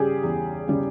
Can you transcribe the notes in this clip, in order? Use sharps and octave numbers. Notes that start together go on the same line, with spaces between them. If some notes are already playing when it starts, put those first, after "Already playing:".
Already playing: C#3 G3 G4 G#4
E2
C#3 G3